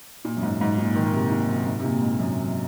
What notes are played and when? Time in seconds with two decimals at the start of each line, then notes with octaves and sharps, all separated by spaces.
0.25 A#2
0.37 F#2
0.43 G#2
0.61 G#2
0.78 A#2
0.96 D#3
1.13 C3
1.32 A#2
1.48 F#2
1.67 G#2
1.79 C3
1.85 A#2
2.01 G#2
2.19 F#2